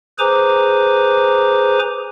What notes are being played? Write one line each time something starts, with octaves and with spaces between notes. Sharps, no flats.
G#4 B4 C5 G#5 A#5 D6